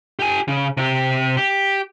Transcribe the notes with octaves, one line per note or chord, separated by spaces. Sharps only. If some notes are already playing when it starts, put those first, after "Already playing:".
G4 G#5
C#3
C3 G4
G4